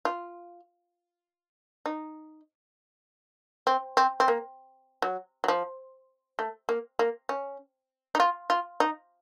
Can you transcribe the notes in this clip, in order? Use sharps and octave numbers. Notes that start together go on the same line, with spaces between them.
F4
D#4
C4
C4
C4
A#3
F#3
F#3
F3
A3
A#3
A#3
C#4
D#4
F4
F4
D#4